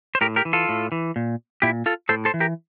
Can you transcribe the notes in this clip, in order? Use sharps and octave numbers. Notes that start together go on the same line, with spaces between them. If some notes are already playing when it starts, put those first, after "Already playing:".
C5
A2 G4 A#4
G4 A#4
E3
F4 A4
A2
E3
A#2
A#2 E4 G4
F4 A4
A2 A4 C5
A4 C5
E3
G4 A#4